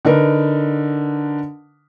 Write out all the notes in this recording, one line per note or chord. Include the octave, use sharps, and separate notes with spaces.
D3 D#4 A#4 B4